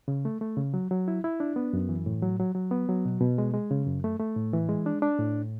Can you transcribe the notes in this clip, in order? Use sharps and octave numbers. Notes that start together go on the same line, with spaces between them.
C#3
A3
A3
C#3
F#3
F#3
E4
E4
D4
B3
F#2
E3
A2
F#3
F#3
F#3
B3
F#3
B2
B2
G#3
G#3
C#3
F#2
A3
A3
A2
E3
G#3
D4
D4
A2